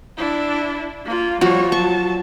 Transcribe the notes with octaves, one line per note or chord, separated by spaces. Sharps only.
D4 E4
A#3 F4
F3 G3 F#4 C#5
F#3 A5 C#6